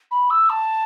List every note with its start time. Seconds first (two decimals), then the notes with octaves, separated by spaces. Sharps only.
0.11 B5
0.30 E6
0.49 A5